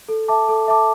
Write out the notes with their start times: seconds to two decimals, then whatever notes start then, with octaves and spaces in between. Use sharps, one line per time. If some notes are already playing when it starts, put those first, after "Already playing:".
0.08 A4
0.28 E5 A5 D6
0.48 A4
0.68 E5 A5 D6